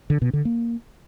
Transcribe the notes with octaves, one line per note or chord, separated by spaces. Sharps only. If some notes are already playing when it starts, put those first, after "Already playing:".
D3
B2
D3
A#3